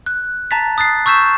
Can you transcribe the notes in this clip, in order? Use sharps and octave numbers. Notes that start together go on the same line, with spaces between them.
F#6
A5 A#5 A6 B6
D#6 F#6 A6 C7
C#6 E6 G6 B6 E7